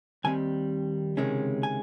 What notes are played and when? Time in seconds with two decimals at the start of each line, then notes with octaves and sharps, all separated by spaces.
0.24 D#2 D#3 G3 C4 G#5
1.17 C#2 C3 D#3 G#3 C#4
1.63 G#5